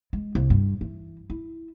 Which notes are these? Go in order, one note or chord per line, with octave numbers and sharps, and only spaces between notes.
G#3
C2
G2
E3
E4